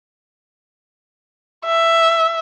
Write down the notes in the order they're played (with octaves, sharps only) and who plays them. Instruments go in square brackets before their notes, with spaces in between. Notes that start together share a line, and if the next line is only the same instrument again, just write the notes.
[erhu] E5